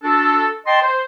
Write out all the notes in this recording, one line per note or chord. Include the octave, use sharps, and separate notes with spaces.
D4 F#4 A4
D#5 G5 A5 C6
C5